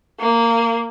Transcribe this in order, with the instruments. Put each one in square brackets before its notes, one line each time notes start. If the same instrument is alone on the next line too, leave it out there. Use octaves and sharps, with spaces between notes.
[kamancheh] A#3